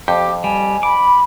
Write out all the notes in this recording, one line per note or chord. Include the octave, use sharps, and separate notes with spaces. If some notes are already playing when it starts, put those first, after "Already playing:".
F2 G4 D6
G3 G#5
B5 D6